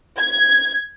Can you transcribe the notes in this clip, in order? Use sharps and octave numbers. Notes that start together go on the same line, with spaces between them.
G#6